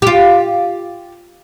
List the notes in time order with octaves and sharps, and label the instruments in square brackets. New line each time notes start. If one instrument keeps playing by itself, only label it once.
[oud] F4 G4